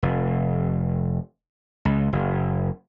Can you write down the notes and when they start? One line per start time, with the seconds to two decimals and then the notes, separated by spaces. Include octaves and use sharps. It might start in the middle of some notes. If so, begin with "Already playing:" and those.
0.03 F1
1.85 C#2
2.13 F#1